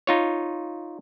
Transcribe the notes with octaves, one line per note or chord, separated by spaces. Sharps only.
D#4 F4 C#5